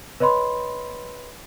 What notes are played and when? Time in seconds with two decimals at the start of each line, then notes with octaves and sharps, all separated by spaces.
0.20 B4 C#5 D#5 B5 C6